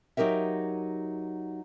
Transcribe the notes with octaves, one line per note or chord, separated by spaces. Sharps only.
F#3 D#4 G4 A#4 E5